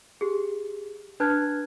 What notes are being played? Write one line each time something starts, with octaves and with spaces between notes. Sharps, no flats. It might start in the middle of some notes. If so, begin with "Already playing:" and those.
G4 G#4
D4 B4 A5 F6 F#6 G#6